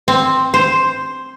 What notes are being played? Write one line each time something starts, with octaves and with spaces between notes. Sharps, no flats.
C4
C5